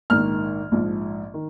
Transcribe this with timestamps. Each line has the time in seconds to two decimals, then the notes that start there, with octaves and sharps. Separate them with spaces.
0.10 A#1 G#2 D#3 F6
0.72 A#1 G#2 F3
1.34 D#3